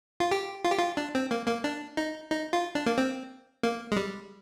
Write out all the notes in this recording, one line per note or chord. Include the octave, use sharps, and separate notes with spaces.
F4
G4
F4
G4
F4
D4
C4
A#3
A#3
D4
D#4
D#4
F4
D4
A#3
C4
A#3
G#3
G3